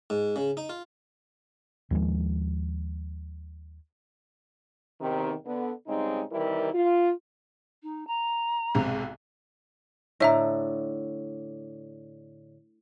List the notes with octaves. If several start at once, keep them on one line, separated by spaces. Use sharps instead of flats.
G#2
C#3
D#4
F4
D#2 F3 G#3
E2 C3 D#3
D3 B3
C#3 G3 G#3 C4 D#4
C3 D#3 E3 G3 E4 A#4
F4
D#4
A#5
B1 G#2 C3
A2 D3 D#5 E5 A#5